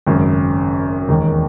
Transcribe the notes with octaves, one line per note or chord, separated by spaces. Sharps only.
G#1 F#2 C#3
E1 D#2 D#3 A#3 D#4